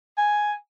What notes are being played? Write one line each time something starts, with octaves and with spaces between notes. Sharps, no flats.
G#5